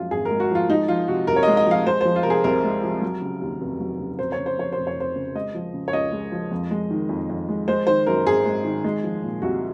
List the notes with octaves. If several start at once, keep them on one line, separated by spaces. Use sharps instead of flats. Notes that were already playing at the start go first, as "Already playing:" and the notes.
Already playing: F#2 F3 G#3 F4
G#1 G#4
A#4
G#3
F#4
F3 F4
G#3 D#4
F3 F4
C3 F#4
C2 A#4
C#5
G#3 D#5
D#5
F3 F5
G#3 C5
F3 C5
F4
C3 A#4
G#4
C2 A#4
G#3
F3
F#3
C#3
D#2
F1
F#3
C#3
F1 C5
C#5
C#3
C5
F2 C#5
F1 C5
C#5
F1 C5
C#3
G#3 D#5
F3
C#3
C#5
C#2 D#5
G#3
F3
F2
G#3
D#3
F2
F2
G#3
G#3 C5
D#3 C5
F#2 A#4
G#1 G#4
G#3
D#3
G#3
F3
A#2
C2 F#4